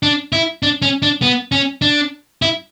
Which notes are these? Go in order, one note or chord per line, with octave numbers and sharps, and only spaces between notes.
D4
E4
D4
C#4
D4
B3
C#4
D4
E4